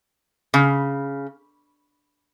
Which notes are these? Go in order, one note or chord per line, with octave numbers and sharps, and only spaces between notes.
C#3